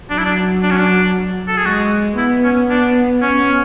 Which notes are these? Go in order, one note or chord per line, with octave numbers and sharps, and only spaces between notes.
F#3 D4
E4
D4
D4
C#4
D4
A4
G#4
G#3 F#4
B3 E4
C#4
D4
C#4